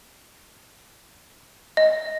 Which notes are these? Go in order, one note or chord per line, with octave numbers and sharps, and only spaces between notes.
D#5